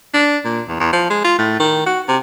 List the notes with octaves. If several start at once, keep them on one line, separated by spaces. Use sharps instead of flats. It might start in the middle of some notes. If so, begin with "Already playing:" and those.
D4
A#2
E2
E2
F3
G#3
F4
A2
D#3
F#4
C3